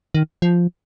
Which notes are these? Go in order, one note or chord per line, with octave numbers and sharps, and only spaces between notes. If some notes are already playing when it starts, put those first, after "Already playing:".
D#3
F3